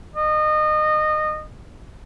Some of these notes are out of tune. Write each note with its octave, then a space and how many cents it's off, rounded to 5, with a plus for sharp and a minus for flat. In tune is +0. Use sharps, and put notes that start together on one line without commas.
D#5 -25